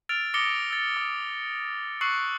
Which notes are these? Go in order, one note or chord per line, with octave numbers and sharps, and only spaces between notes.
E6 F6 A6 D7 F7
D6 D#6 A6 A#6 C#7 G7
E6 A6
D#6
C#6 E6 F#6 C7 C#7 F#7